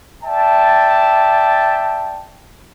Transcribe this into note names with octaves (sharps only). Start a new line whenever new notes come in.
D5 E5 G5 A5